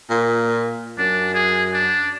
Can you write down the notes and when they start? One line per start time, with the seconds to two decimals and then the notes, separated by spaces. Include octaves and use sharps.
0.10 A#2
0.98 F#2 D4
1.34 G#4
1.73 D4